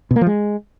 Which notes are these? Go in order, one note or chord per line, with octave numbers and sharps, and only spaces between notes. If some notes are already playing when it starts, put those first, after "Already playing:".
B2
A#3
F3
G#3